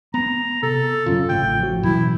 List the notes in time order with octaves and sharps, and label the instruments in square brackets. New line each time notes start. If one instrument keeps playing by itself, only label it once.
[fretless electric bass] B3 [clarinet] A#5
[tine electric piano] C3 [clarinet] A4
[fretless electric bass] F#2 C#3 [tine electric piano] C#4 F4
[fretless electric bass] A1 A2 C#3 [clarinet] G5
[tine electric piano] F3 F#4
[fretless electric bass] F#2 [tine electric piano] B2 E3 [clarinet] E4